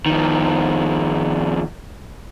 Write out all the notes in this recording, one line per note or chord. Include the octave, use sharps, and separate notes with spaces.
F2 D#3